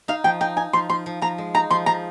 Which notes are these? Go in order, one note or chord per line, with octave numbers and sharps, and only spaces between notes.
D#4 F5
F3 G5
D#4 G5
D#4 G#5
F3 C6
F3 C6
F3
F3 A#5
G#3
D#4 A#5
F3 C6
F3 A#5